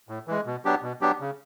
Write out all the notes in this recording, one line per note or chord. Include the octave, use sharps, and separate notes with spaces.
A2
E3 G#3
B2
F#3 B3 D4 G4
B2
F#3 B3 D4 G4
C#3